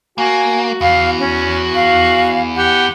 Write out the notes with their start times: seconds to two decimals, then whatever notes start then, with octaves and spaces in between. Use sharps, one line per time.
0.18 A#3 F#4 G#5
0.81 E2 F5
1.19 C#4
1.75 F5
2.56 G4 F#5